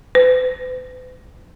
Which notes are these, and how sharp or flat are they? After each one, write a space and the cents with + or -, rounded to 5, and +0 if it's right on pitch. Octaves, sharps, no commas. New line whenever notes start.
B4 +45